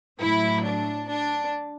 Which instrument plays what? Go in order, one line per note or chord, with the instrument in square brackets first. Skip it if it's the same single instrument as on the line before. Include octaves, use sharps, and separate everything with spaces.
[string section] A2 F#3 E4
D4
D4